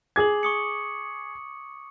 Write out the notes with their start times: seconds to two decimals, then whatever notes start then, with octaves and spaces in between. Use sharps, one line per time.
0.16 G#4 D6 G#6 F#7
0.43 C#6 D#6 C#7